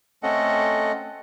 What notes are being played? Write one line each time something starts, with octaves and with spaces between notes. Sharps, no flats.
A3 C4 C#4 A4 D#5 F#5